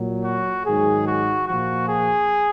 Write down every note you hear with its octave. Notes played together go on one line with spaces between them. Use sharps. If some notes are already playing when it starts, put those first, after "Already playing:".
Already playing: A#2 F#3
F#4
G#2 D#3 F#3 G#4
F#4
A#2 F3 F#4
G#4